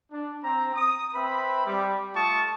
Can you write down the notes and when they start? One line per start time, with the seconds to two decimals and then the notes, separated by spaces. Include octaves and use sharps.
0.12 D4
0.44 C4 A#5
0.74 D#6
1.14 C4 B4 E5 B5
1.66 G3 D6
2.15 A3 F4 A5 C#6 D#6